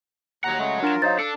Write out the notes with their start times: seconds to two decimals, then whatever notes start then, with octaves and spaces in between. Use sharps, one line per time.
0.44 D#2 F#3 F#5 A#5
0.59 C#3 G#3 A3
0.83 D4 F4 A#4 E7
1.02 F#3 D#4 C5 F5 A6
1.19 D4 A4 C#7